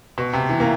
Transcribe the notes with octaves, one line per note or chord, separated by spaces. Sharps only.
B2
C3
E3
A#3